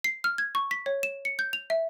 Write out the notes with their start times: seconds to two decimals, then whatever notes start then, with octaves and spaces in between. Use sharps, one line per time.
0.04 C7
0.24 F6
0.38 G#6
0.55 C#6
0.71 B6
0.86 C#5
1.03 E7
1.25 C#7
1.39 G6
1.53 F7
1.70 E5